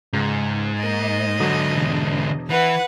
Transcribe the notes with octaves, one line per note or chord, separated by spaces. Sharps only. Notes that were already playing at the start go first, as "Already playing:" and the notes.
C#2 G#2
A#3 D#5 D7
G#2 D3 F#3 A4 D#6
E1 E2
E3 B4 F#5